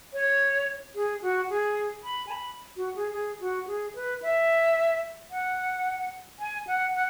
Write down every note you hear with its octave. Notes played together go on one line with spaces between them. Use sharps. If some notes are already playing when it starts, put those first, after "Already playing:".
C#5
G#4
F#4
G#4
B5
G#5
B5
F#4
G#4
G#4
F#4
G#4
B4
E5
F#5
G#5
F#5
F#5